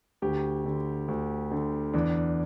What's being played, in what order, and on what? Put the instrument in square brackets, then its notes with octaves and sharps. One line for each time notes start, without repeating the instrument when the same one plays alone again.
[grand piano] D2 G4
D3
D2
D3
E2 D4